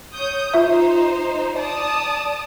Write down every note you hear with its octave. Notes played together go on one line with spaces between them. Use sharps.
C#5 D#6 G6
D#4 F4 C5 E5
D5 A5 D#6